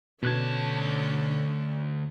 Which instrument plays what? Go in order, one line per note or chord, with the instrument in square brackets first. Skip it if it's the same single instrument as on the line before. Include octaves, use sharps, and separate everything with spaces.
[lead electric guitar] D2 A5 [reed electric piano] B2 F#6 G#6 [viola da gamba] D3 C#4 D4